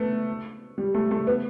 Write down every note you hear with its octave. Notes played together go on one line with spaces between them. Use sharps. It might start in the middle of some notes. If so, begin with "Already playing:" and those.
Already playing: A3 B3
G3
A3
A3
B3